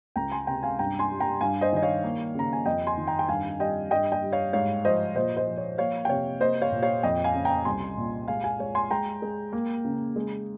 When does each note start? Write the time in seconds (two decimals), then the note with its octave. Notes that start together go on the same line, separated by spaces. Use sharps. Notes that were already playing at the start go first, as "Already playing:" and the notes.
0.16 C#2 G5 A#5
0.32 G#5 C6
0.47 C3 G5 A#5
0.63 F5 G#5
0.79 G2 G5 A#5
0.99 G#5 C6
1.10 G3
1.20 G5 A#5
1.41 G2 F5 G#5
1.61 C5 D#5
1.73 D#3 D#5
1.82 C#5 F5
2.04 A#3
2.35 C#3 A#5
2.53 G#5
2.66 F2 D#5 G5
2.87 G#5 C6
2.98 D#3
3.07 G5 A#5
3.19 G5
3.28 G2 F5 G#5
3.60 G3 D#5 G5
3.91 G2 D#5 G5
4.12 D#5 G5
4.22 G3
4.32 C#5 F5
4.53 G#2 C#5 F5
4.85 F3 C5 D#5
5.16 A#2 C5 D#5
5.37 C5 D#5
5.47 F3
5.58 C#5
5.78 A#3 C#5 F5
6.05 G5
6.09 C3 C#5 F5
6.41 A#3 C5 D#5
6.62 C#5 F5
6.72 A#2
6.83 C#5 F5
7.03 F2 D#5 G5
7.24 F5 G#5
7.34 C#3
7.45 G5 A#5
7.65 C2 G#5 C6
7.97 A#2
8.28 G#3 F5 G#5
8.44 F5 G#5
8.59 G#3 C#5
8.75 G#5 C6
8.91 G#3 G5 A#5
9.22 G#3
9.53 A#3
9.85 C#3
10.16 G#3